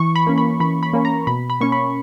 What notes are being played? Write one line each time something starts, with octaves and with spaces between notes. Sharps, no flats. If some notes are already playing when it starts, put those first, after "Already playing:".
Already playing: E3 C#6
B5
A#3 C#4
B5
E3 B5
B5
A#3 C#4
A#5
B2 B5
B5
A#3 C#4 C#6
B5